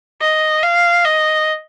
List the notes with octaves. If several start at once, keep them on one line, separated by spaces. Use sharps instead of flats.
D#5
F5
D#5